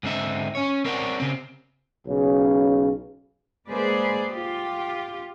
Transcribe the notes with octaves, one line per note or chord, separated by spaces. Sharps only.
G#2 D3 C4 D#4 E5
C#4 C#5
C4 A#4 C#5 D5 F5 F#5
C#3 C4
B1 C#3
G#3 A#3 G#4 B4 C5 D5
F4 G4